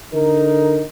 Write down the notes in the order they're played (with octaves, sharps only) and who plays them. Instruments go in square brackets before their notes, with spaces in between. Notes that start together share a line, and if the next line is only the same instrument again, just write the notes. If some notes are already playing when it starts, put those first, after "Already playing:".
[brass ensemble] D3 D#4 A#4